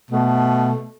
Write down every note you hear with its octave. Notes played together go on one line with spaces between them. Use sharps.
B2 A3